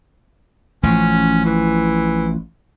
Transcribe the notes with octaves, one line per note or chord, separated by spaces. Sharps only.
A1 F3 C#4
E3